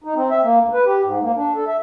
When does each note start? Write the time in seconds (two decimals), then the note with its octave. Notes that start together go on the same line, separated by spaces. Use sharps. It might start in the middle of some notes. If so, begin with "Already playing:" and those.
0.04 D#4
0.16 C4
0.31 E5
0.44 A#3
0.61 D2
0.73 B4
0.85 G4
1.04 G#2
1.23 A#3
1.37 D4
1.55 A4
1.67 E5